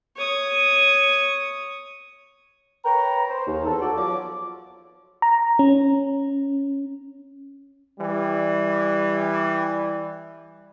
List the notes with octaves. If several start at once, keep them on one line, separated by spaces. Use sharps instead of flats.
C#5 D#6
B4 C#5 G5 A#5
C5
D#2
E2 A4
F#4 A4 D5
F3 F#3 D6
A#5
C#4
E3 G3